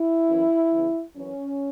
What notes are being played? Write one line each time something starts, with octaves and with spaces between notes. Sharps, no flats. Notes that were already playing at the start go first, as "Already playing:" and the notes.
Already playing: E4
F#2 E3
E2 C#3 E3
F#2 E3 C#4